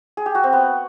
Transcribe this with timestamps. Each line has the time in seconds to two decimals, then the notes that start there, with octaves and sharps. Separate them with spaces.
0.17 G#4
0.26 G4
0.35 F#4
0.43 C4
0.53 B3